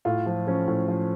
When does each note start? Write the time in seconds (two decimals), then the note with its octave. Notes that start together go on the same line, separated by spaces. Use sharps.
0.05 A2 F4
0.26 F3
0.47 F3 C#4
0.68 A2
0.88 F3